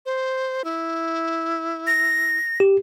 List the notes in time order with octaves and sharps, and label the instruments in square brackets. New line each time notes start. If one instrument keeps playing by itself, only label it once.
[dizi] C5
E4
[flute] A#6
[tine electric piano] G4